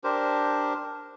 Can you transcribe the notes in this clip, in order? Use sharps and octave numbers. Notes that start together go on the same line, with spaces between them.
D4 G4 A#4 C5